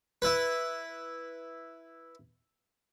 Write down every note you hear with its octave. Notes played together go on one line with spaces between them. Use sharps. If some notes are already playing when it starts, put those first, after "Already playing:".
E4 B4